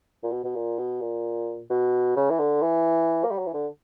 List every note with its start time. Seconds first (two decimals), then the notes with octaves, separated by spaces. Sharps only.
0.23 A#2
0.32 B2
0.44 B2
0.55 A#2
0.78 B2
1.01 A#2
1.70 B2
2.16 C#3
2.30 E3
2.39 D3
2.62 E3
3.24 A#3
3.31 G3
3.38 F#3
3.46 E3
3.54 D3